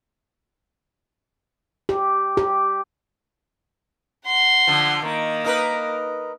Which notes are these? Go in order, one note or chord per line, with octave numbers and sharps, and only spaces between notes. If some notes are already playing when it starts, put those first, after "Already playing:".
G4
G4
F#5 C6
D3 F3
D#3 A#3
D#4 A#4 B4